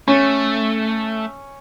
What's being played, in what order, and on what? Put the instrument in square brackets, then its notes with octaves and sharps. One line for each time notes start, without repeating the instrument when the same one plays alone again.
[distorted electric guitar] A3 [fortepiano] C#4